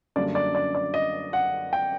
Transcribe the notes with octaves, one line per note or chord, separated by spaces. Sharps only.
F#2 D3 G3 A#3 D4 D5
D5
D5
D5
D#5
F#5
G5